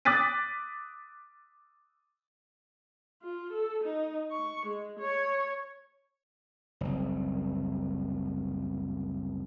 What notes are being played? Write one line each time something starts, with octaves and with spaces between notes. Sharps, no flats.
D6 D#6 F#6 A6 B6 D#7
F4
A4
D#4
C#6
G#3
C#5
F#1 C2